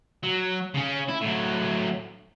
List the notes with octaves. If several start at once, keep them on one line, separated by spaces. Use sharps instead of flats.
F#3
C#3 C#4
E4
A2 F#3